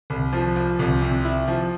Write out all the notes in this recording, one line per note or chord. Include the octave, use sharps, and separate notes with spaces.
C2
F3
F3
C2
C3
E4
F3